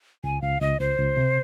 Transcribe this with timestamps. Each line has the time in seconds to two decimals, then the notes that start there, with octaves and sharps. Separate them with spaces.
0.24 C#2 G#5
0.42 C#2 F5
0.61 C#2 D#5
0.80 C#2 C5
0.98 C#2
1.17 C3